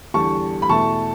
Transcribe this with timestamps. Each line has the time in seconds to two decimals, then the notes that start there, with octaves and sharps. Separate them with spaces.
0.14 E2 D3 G3 A5 C#6
0.62 B5
0.69 E2 B2 A3 A5 C#6